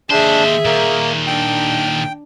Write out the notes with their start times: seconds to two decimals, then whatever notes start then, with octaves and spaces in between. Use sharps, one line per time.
0.10 D#2 D4 G#4 C5 E5
0.65 A#2 D#3 A#3
1.27 D4 G5